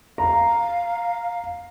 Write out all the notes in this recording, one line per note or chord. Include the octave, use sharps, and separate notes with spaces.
F5 A#5